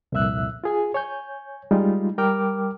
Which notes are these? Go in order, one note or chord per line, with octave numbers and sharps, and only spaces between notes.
C2 F2 A#2 E5 E6 F#6
F4 G#4 G#5
C#5 G#5 G6
G3 G#3 D#4 F4
G3 A#4 G5 D6 F6